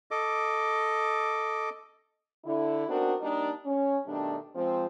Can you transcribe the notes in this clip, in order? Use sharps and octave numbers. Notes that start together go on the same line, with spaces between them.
A4 D#5 D6
D3 E4
B3 C4 D4 D#4 F#4 A#4
G3 A#3 D4 D#4
C#4
B2 D#3 G3 A3 D4
F3 G#3 C4